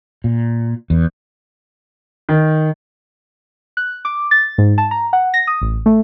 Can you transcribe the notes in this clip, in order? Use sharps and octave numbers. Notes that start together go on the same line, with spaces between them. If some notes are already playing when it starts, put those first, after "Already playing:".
A#2
E2
D#3
F#6
D6
A6
G#2
A5
A#5
F#5
A#6
D#6
A1
A3